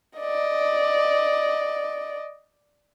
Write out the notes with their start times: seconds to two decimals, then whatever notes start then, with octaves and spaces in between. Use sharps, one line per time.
0.19 D5 D#5